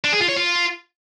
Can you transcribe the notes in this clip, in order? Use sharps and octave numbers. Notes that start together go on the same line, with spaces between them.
D4
G#4
F4
C#5
F4